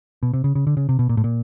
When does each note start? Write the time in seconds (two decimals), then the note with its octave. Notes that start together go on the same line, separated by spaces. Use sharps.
0.23 B2
0.33 C3
0.44 C#3
0.55 C#3
0.67 D3
0.77 C#3
0.89 C3
0.99 B2
1.09 A#2
1.17 A2
1.24 A#2